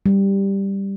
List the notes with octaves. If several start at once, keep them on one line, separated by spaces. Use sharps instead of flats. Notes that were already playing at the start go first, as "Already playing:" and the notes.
G3